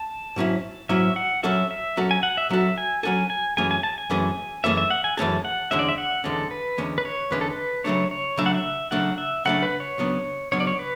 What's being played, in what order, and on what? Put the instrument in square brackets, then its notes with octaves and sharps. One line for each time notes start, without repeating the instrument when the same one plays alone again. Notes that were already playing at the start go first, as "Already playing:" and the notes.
Already playing: [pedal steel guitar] A5
[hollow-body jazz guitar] G#2 F#3 C#4 E4
[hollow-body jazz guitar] G#2 F#3 C#4 E4 [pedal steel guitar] E5
[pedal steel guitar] F#5
[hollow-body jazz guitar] F#3 C#4 F#4 A4 [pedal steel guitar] E5
[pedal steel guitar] E5
[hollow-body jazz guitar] F#3 C#4 F#4 A4
[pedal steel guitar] G#5
F#5
E5
[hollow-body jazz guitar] F#3 C#4 F#4 A4 [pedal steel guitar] E5
[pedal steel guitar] G#5
[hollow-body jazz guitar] F#3 C#4 F#4 A4 [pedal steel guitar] G#5
[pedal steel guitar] G#5
[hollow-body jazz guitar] F#2 E3 A3 C#4 G#4 [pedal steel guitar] G#5
[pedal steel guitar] G#5
A5
G#5
[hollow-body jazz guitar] F#2 E3 A3 C#4 G#4
[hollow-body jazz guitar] F#2 E3 A3 C#4 G#4 [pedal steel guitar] E5
[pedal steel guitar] E5
F#5
G#5
[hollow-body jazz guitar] F#2 E3 A3 C#4 G#4 [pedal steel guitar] A5
[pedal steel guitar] F#5
[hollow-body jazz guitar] E2 D3 G#3 C#4 [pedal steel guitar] E5
[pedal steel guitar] D5
E5
F#5
[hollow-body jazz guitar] E2 D3 G#3 C#4 [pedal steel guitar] A4
[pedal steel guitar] B4
[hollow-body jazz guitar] E2 D3 G#3 C#4
[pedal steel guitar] B4
C#5
[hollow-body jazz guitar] E2 D3 G#3 C#4 [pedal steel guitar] B4
[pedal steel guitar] A4
B4
[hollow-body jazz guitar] C#3 F#3 A3 D4 [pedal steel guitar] C#5
[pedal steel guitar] C#5
[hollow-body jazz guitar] C#3 F#3 A3 D4 [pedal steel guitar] E5
[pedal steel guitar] F#5
E5
[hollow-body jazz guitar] C#3 F#3 A3 D4 [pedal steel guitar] F#5
[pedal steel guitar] E5
[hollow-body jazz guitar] C#3 F#3 A3 D4 [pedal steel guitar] F#5
[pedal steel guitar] B4
C#5
[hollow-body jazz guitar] C#2 C#3 F#3 B3 D4
[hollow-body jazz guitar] C#2 C#3 F#3 B3 D4 [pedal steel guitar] C#5
[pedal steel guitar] D5
C#5
B4